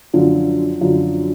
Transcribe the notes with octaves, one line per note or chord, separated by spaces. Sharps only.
F#2 D3 F3
F#2 D3 F3